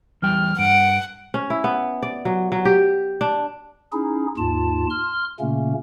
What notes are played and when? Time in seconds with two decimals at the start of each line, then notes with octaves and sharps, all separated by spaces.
0.22 E2 G3 G5 F6
0.59 G2 F#5 D7
1.34 C#4
1.50 E4
1.64 B3
2.02 D5
2.25 F#3
2.52 F#3
2.65 G4
3.21 D4
3.92 C#4 D#4 E4 G#4
4.37 D#2 G#2 F4 A5
4.90 C6 F6
5.40 A#2 C#3 A3 A#3 C#4